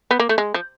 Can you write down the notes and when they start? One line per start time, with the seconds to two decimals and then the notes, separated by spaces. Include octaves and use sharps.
0.11 B3
0.19 A#3
0.29 A3
0.38 G#3
0.54 F3